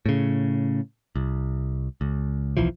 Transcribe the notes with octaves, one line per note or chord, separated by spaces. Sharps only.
A2 C#3
C2
C#2
D#1 B1 E3 F3